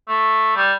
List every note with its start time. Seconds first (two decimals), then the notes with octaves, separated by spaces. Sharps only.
0.08 A3
0.56 G3